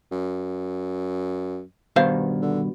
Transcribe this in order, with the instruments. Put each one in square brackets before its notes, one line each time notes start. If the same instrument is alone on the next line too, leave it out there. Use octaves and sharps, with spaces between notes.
[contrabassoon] F#2
[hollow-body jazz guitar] G2 B2 D#3 [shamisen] C5 F5
[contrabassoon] D3